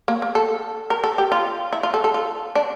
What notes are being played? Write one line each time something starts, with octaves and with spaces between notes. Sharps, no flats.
A#3
A#3
A4
A#4
A4
G4
F4
E4
F4
A4
A4
F4
D4